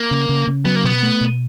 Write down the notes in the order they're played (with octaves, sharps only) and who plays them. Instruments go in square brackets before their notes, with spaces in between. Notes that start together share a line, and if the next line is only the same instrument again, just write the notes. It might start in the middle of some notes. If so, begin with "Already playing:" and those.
Already playing: [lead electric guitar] A#3
[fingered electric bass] C#3
C#3
C#3
[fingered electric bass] F#3 [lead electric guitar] B3
[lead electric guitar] A#3
[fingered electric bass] B2 [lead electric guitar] B3
[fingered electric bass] A3
B2